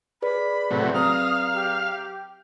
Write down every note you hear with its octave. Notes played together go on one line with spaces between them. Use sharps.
G#4 B4 D5 B5
A2 C3 F#3
F#3 C4 F5 A#5 D#6
G4